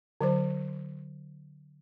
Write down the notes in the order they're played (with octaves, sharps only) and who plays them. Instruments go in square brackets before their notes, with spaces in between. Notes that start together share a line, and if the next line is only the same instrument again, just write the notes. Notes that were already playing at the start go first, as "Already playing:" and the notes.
[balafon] D3 F#3 C5